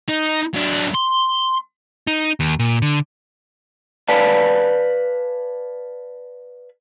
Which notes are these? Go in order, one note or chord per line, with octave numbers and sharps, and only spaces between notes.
D#4
F#3 D4
C6
D#4
D#2
A#2
D3
B4 D5 F5 G#5 A5